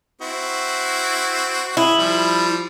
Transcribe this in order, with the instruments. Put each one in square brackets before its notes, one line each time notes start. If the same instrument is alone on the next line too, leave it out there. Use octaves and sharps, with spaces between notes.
[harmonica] C4 E4 F#4
[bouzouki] E4 [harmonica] G#4
[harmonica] F3 G3